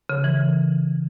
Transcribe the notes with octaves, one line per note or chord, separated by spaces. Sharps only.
C#3
E3